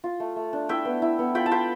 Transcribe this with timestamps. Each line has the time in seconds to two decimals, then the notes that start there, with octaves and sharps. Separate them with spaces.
0.04 F4
0.20 A3
0.36 A3
0.53 D4
0.69 E4 E5 G5
0.85 B3
1.02 E4
1.19 B3
1.35 F4 G5 B5
1.46 A5
1.51 F4 G5 B5